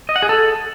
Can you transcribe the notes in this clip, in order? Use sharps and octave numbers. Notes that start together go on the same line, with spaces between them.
D#5
F#5
G#4
A4